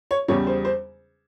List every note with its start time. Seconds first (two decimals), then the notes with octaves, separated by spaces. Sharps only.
0.11 C#5
0.28 E2 C#3 G3 C#5
0.47 C5
0.65 C5